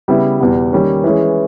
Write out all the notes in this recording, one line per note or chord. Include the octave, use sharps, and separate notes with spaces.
C#3 G3 B3 E4
E2 B2 G3
D#3 G3 A#3 C#4
E3 G#3 C#4